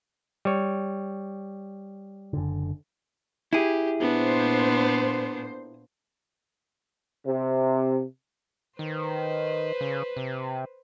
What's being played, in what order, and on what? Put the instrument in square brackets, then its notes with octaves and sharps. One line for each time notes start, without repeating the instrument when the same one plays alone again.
[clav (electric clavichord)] G3 C#5
[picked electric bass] F#1 D3
[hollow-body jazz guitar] E4 G#4 [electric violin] G4
[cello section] A#2 C5 [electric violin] B3 D4
[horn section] C3
[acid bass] D#3 [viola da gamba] B4 C5
[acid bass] C#3
C3